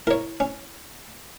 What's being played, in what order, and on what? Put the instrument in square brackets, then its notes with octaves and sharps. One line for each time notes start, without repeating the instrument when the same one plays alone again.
[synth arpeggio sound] E4 [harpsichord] A#4 C#5
[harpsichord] C#4